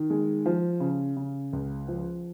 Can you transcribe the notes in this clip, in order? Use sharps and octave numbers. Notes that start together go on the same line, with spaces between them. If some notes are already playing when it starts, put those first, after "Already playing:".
Already playing: D#3
G#3
F3
C#3
C#3
C#2
F3